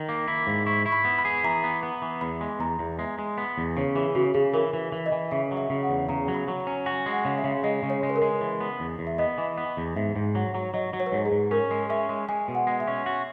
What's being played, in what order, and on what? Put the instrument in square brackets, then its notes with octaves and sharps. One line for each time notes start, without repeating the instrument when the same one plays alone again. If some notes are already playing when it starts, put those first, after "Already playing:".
Already playing: [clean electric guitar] D#3
A#3
E4
G#2
[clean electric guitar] E4 [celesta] C#6
[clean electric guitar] E4 [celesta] C#6
[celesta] B5
[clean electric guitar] B3
[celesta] B5
[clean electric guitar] G#4
[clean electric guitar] E3 [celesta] A#5
[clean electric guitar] B3
B3
E3
[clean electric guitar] E2 [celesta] B5
[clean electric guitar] G#3
[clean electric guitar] E2 [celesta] A#5
[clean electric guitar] E2
[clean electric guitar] G#3 [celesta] E5
[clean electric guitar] G#3
B3
E2
[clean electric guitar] C#3 [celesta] C#5
[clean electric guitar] E3 [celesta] G#4
[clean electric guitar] C#3 [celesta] F#4
[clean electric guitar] C#3 [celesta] G#4
[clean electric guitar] E3 [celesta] A#4
[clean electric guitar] E3
E3
[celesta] D#5
[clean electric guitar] E3
[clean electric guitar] C#3 [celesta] E5
[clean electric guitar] F#3
[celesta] E5
[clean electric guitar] C#3
[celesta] F#5
[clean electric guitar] E2
[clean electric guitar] C#3 [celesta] A#5
[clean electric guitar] F#3
[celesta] B5
[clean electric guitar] F#3
[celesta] A#5
[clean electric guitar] C#4
[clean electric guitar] F#4 [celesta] G#5
[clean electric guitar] G#3
[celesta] F#5
[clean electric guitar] C#3
[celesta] E5
[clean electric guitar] C#3
[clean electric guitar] G#3 [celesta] D#5
[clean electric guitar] C#3
[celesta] C#5
[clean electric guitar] G#3
[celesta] B4
A#4
[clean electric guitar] G#3
E3
B3
E2
E2
[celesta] E5
[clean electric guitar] B3 [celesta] D#5
[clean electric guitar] E3
B3
E2
[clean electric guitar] G#2 [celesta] E5
[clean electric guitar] G#2
[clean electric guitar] F#3 [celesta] F#5
[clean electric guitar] F#3
[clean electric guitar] F#3 [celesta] D#5
[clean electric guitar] F#3
[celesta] C#5
B4
[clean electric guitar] G#2 [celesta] C#5
[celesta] G#4
[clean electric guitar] G#2
[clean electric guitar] C#4 [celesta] A#4
[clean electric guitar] G#3
[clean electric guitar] C#4 [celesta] E5
[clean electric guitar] G#3
[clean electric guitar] G#3 [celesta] G#5
[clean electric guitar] B2
[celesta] F#5
[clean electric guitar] G#3
[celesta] E5
[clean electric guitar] C#4
F#4